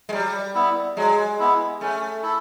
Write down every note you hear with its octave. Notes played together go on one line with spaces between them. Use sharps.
G#3
F#3 G3
B3 E4
F#3 G#3
B3 E4
A3 C#4
E4 A4